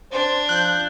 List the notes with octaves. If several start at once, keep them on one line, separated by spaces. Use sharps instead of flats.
D4 C5
F3 F#6 G6